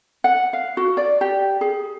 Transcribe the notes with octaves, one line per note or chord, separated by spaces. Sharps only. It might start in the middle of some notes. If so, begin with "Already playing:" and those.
F#5
F5
F#4
D5
G4
G#4